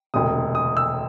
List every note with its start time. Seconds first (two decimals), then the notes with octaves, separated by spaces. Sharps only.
0.14 E1 D2 C3 D#6
0.55 D#6
0.77 E6